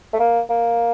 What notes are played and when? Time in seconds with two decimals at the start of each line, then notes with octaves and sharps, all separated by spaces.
0.13 A3
0.20 A#3
0.50 A#3